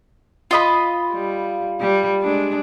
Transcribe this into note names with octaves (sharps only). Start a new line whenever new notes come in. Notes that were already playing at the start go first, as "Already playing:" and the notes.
F4 D#5 B5
G3
G3
G#3 D4